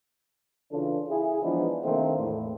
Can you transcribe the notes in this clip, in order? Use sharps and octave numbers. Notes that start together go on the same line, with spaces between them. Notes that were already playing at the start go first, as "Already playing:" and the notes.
C#3 E3 D4 F4 A4
E4 G#4
E3 F3 G#3 B3 D4 D#4
C3 D#3 A3 A#3 C4 D4
E2 A2